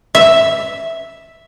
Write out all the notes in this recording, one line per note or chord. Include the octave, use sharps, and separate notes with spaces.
E5